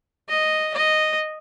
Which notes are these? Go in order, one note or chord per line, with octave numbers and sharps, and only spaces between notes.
D#5
D#5